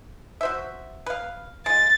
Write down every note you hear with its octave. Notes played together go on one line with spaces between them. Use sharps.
F#4 C5 E5
B4 F5
G#3 F4 A6